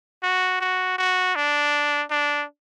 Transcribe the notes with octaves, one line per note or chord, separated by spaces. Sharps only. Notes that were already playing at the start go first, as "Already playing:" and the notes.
F#4
F#4
F#4
D4
D4